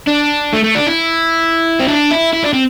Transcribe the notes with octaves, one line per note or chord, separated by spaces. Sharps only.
D4
A3
A3
D4
E4
C4
D4
E4
E4
D4
C4